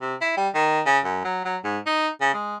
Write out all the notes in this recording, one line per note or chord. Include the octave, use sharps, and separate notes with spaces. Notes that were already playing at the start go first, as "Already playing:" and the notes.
C3
E4
G3
D#3
C#3
F#2
F#3
F#3
G#2
D#4
C#3
G#3